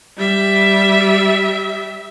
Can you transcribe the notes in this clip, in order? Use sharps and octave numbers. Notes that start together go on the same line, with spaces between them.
G3 E5